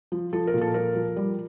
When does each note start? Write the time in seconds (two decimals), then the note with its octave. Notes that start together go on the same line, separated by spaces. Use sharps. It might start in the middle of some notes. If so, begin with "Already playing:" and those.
0.12 F3
0.33 F3 A4
0.47 A#4
0.54 A#2
0.61 A4
0.74 F3 A#4
0.95 F3
1.16 G3